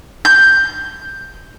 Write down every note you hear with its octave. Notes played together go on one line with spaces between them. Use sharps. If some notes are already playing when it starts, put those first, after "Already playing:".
G6